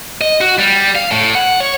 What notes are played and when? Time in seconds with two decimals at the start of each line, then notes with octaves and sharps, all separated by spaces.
0.21 D#5
0.41 F#4
0.59 G3
0.95 F5
1.11 A2
1.35 F#5
1.60 C#5